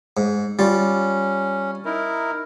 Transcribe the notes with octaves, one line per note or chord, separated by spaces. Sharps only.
G#2
G3 C#4 F4
D#4 E4 A#4